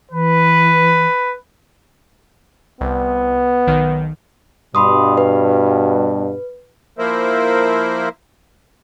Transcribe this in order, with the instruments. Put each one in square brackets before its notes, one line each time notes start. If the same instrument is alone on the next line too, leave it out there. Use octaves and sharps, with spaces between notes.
[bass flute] E3 [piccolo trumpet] B4
[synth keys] C2 [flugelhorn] B3
[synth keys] B1 D#3
[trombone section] G2 B2 [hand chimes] B5 C6 D#6
[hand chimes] B4
[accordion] F3 A#3 E4 A#4 C5 E5